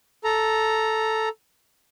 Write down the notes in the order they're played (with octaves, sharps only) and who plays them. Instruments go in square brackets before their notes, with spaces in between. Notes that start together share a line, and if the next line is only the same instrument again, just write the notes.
[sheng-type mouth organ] A4 A#5